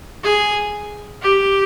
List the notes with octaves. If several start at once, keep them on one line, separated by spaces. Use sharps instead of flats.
G#4
G4